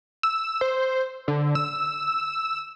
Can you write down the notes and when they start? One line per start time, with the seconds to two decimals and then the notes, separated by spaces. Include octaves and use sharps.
0.23 E6
0.61 C5
1.28 D3
1.55 E6